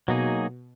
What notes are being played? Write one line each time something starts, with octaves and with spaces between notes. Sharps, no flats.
B2 F#3 A#3 D#4 G#4